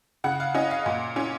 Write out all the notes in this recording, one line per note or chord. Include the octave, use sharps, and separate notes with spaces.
C#3 F#5
F5
C#4 D#5
F5
A#2
C#4